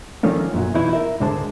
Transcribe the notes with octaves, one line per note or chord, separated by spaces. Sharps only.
D#3 F3 A3 A#3 C#4 D4
F#2 A#2 F#3
B2 E3 D#4 E4
A#4 E5
C#2 G#2 D3 G#3 C5 A5